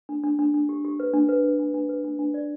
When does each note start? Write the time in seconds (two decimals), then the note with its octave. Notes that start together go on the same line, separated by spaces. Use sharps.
0.09 D4
0.23 D4
0.39 D4
0.54 D4
0.69 G4
0.85 G4
1.00 B4
1.14 D4
1.29 B4
1.44 B4
1.59 D4
1.74 D4
1.89 B4
2.05 D4
2.19 D4
2.34 D5